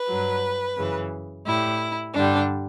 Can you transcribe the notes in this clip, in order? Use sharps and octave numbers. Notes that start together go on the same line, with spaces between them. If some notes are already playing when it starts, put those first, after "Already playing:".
Already playing: B4
G2 F#3
F#2 C#3 E3
A2 G3 E4
G2 D3 G3 D4